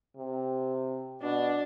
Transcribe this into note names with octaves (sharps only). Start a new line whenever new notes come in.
C3
B2 D4